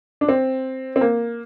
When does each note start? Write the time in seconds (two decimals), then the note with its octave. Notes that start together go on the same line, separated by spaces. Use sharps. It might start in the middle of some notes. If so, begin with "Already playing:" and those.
0.21 D4
0.29 C4
0.96 C4
1.01 A#3